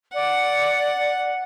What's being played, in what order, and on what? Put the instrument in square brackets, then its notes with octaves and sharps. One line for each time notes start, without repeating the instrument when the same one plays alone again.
[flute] D5 [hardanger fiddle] F#5